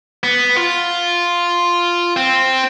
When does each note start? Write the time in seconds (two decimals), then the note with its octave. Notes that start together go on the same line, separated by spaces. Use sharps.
0.23 B3
0.57 F4
2.17 C4